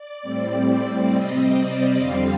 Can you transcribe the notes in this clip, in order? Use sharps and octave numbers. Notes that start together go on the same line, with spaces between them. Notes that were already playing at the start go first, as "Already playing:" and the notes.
Already playing: D5
A2 G3 C4
C3 G3 C4 D#5
D5
F2 D3 G3 C4 F5